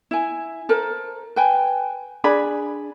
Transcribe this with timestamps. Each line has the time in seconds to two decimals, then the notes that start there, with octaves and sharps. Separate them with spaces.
0.11 E4 G#5
0.69 A4 A#4 C5
1.36 B4 G5 G#5
2.24 D4 G#4 D5 B5